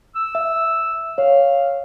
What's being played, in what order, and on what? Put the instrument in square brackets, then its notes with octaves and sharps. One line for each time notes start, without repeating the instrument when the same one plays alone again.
[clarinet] E6
[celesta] E5
[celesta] C#5 [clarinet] F5